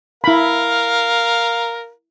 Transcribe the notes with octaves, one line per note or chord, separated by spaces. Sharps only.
E4 A#4 F5 B5